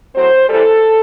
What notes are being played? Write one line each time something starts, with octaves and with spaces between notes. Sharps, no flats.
A2 F#3 C4 C5
C3 E3 G3 A4